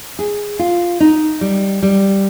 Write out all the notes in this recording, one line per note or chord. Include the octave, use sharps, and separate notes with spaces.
G#4
F4
D#4
G3
G3